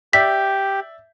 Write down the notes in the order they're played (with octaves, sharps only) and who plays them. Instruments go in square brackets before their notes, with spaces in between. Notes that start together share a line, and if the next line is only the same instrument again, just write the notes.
[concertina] G4 [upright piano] D5 E5 G6 [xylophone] B6